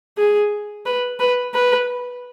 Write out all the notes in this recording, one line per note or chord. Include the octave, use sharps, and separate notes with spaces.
G#4
B4
B4
B4